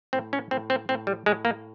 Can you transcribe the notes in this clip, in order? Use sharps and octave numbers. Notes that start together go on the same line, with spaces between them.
A2 C4
C#4
A2 C4
C4
A2 C4
G3
A2 G#3
A#3